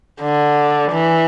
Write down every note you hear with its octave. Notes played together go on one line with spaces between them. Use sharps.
D3
E3